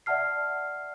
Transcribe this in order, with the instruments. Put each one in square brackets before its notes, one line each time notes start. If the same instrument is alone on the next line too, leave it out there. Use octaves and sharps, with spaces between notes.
[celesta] D5 E5 F#5 A5 F6 C7